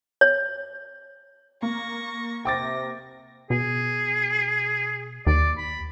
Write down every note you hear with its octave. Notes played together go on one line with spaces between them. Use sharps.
C#5
A#3 C#6 A#6
C3 G5 D6 A6 A#6
B2 G#4
D#2 D5
B5